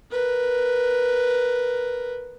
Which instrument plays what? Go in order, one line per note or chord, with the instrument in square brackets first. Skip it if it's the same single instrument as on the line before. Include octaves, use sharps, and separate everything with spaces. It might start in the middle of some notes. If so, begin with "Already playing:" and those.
[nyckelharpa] A#4 B4